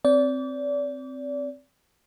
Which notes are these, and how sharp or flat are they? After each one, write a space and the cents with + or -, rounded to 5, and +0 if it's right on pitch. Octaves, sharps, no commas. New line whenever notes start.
C4 +0 D5 -30